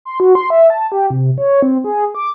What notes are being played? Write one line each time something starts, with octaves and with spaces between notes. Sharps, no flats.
C6
F#4
C6
E5
A5
G4
C3
C#5
C4
G#4
D6